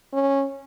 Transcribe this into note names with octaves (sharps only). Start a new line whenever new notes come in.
C#4